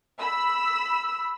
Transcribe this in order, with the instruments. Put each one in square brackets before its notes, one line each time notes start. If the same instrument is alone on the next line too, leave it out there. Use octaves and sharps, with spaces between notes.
[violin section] B5 E6